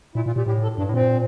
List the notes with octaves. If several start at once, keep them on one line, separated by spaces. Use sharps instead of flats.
A#2 E4
A#2 F4
A#2 G4
A2 G4
A4
G2 D4
A2
A#2 C4